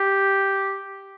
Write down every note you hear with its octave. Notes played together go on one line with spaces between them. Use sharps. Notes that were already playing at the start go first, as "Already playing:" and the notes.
Already playing: G4